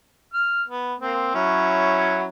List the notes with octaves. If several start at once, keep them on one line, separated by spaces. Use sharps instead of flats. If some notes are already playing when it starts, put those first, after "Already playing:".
F6
B3
A#3 C4
F#3 C#4 E4